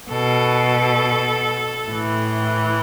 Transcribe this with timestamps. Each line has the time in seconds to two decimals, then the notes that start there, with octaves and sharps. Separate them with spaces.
0.10 B2 A4
1.87 A2 E3